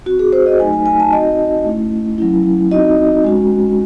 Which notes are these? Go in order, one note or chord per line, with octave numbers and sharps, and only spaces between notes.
C4 F#4
G#4
C5
D#5
F#3 A3 D#4 G#5
G#5
G#5
A5
C4 D#4 F#4 D#5
A3 C#4 E4
F#3 C#4 E4
C4 D#4 F#4 D#5
G#3 C#4 F#4